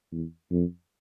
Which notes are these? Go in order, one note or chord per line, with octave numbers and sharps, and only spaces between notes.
E2
F2